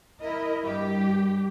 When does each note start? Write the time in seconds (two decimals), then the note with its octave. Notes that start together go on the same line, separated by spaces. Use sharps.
0.20 E4 A#4 D#5
0.65 G2 G3 G4